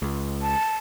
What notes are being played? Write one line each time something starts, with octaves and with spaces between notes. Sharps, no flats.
C#2
A5